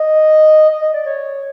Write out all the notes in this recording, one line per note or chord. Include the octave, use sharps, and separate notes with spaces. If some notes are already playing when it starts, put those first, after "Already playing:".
Already playing: D#5
D#5
D#5
D5
C#5